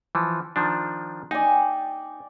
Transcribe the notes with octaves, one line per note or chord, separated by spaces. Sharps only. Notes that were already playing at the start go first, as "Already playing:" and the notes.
E3 F3
D#3 F3 D4
D#4 D5 G5 G#5